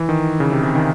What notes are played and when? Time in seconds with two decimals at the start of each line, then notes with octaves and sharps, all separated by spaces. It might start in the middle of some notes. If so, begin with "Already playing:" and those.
Already playing: E3
0.09 D#3
0.40 C#3
0.52 C3
0.63 C3
0.75 D#3